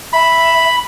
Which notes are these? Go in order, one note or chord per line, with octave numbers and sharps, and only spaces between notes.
E5 B5